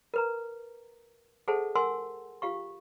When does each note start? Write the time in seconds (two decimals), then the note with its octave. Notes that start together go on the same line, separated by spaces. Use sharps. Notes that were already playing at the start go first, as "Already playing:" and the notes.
0.14 A#4 B4 A#5
1.48 G#4 A4 C5 E5 F#5 A5
1.75 A#4 F#5 G#5 C6 E6
2.42 F4 G4 F5 C#6